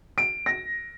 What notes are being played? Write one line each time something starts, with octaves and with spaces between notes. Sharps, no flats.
D7
A#6